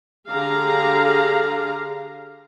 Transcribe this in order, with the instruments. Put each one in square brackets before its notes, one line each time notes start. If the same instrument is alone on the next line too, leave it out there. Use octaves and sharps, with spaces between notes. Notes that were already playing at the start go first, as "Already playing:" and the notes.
[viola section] D3 G4 G#4 F5 A#5